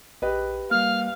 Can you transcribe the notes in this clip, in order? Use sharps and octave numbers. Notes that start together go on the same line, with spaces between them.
A#1 G4 B4 D#5
G3 A#3 F5 F6